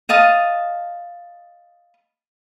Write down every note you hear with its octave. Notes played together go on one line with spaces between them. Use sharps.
D#5 F5 A5 D#6